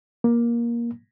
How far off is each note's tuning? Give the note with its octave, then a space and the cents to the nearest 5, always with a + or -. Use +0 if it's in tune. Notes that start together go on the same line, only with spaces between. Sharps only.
A#3 +15